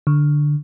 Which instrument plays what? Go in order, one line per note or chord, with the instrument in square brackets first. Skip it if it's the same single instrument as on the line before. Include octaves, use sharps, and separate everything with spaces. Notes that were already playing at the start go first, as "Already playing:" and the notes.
[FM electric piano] D3